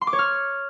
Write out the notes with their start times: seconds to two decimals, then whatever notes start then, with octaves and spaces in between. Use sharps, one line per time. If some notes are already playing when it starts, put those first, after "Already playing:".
0.01 C6
0.07 D6
0.13 C#5
0.19 F6